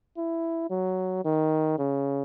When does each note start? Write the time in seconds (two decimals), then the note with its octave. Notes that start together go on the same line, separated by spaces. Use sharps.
0.17 E4
0.70 F#3
1.25 D#3
1.79 C#3